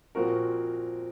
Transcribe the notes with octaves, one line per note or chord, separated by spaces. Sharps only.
A#2 F3 C4 F#4 A#4